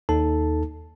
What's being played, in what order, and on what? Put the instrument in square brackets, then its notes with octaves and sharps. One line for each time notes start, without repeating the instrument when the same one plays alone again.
[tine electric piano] D#2 D#4 A4 A5